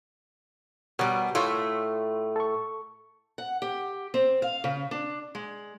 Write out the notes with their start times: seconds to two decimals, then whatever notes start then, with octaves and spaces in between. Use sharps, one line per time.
0.99 B2 G3 F#4 A#4 C#5
1.35 A2 A3 F4 C#5 C6
2.36 A4 C#6
3.38 F#5
3.62 G4
4.14 C4
4.42 F5
4.64 C#3
4.91 D4
5.35 G#3